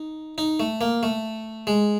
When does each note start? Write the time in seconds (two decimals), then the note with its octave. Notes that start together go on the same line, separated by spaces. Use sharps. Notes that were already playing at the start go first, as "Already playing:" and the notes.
Already playing: D#4
0.38 D#4
0.60 A3
0.81 A#3
1.03 A3
1.67 G#3